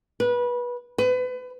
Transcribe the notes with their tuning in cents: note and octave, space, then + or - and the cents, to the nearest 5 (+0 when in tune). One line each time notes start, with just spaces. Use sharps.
B4 -25
B4 +30